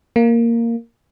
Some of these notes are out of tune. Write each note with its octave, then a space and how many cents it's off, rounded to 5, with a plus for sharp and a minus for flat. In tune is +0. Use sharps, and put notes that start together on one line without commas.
A#3 -5